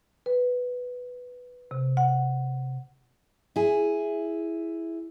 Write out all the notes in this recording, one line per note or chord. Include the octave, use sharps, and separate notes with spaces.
B4
C3
F#5
E4 G#4